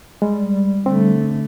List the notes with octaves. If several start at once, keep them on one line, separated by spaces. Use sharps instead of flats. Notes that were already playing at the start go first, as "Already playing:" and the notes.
G3 G#3
D3 A3 C4